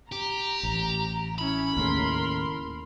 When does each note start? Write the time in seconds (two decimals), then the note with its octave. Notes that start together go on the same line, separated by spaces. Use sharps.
0.12 G4 A#5
0.63 A1
1.38 C#4 E4 B5
1.77 D#2 A2 C#3 A#4 C6